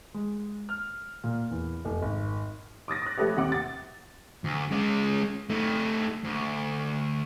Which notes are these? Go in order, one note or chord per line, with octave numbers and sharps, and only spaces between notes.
G#3
F6
A#2
E2
F1
G#1
D6 D#6 A6 A#6
D6 F#6
F3 A3 G4 A4 B4 C#5
D#2 C3 F#5 D6 D#6
A6
D2
G#3 C#4
A3 D#4
D2